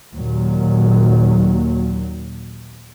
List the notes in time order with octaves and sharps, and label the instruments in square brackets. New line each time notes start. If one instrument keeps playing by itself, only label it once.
[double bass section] D#2 A#2 F#3